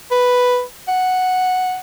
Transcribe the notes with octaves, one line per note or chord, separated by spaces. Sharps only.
B4
F#5